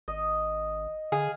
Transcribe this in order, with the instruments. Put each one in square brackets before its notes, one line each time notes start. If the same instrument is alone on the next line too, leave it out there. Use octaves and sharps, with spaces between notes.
[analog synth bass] G#1 [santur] D#5
[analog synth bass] D3 [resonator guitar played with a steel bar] G#4 [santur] F5